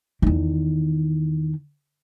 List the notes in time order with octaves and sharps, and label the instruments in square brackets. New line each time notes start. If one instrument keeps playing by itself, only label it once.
[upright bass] E2 D#3